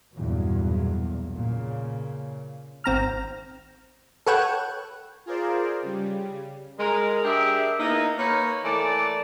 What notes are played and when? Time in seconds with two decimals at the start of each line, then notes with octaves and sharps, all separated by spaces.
0.14 B1 E2 G2 A#2 F#3
1.37 A#2 C#3
2.84 G#1 C4 A#5 F6
4.26 A4 B4 C#5 F#5 G5
5.26 F4 G#4 A#4 C5 D5
5.82 C#3 G3
6.79 G#3 A#4
7.25 D4 G4 G#4 A#4 E5
7.80 A#3 B3 D#4 E4 G#4 A#4
8.18 A#3 D#4 B4 C#5
8.65 E3 A3 A#3 D5